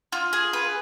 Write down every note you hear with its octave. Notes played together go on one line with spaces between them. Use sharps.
F4
G#4
B4